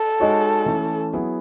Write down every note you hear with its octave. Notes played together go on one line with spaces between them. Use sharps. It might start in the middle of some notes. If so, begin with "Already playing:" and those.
Already playing: A4
G#3 D#4 F#4 C#5
E3 A3 C#4
F#3 B3 E4 G#4